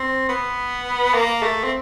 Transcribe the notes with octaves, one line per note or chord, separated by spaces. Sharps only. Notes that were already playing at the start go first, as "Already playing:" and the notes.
Already playing: C4
B3
A#3
A3
C4